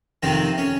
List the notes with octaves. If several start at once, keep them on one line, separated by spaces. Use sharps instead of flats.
F2 C3 D#3 C4
C#4